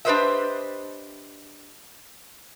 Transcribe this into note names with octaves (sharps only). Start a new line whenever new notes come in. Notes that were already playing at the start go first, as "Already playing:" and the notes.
D4 G4 B4 C5 D#5 E5